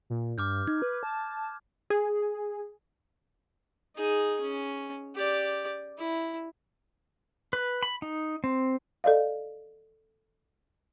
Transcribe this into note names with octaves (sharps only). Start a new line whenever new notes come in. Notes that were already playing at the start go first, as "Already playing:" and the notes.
A#2
G2 D6 F6 G6
D#4 G#6
B4
A5
G#4
D#4 G#4
C#4
G4 D5
E4
B4
B5
D#4
C4
A4 D5 D#5 F5